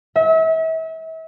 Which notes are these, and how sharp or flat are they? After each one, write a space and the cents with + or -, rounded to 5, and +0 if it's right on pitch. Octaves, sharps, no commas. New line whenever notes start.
E5 -35